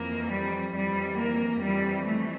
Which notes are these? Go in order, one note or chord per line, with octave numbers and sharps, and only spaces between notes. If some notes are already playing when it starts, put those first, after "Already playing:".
Already playing: F2 E3 A#3
G3
F2 E3 G3
A#3
F2 E3 G3
A3